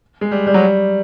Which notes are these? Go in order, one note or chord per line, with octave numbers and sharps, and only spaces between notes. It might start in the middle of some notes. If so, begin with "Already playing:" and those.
G#3
G3
G3
F#3
G3